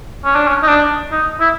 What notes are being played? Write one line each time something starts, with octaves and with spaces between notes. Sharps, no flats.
C#4
D4
C#4
D#4
D4
D#4
E4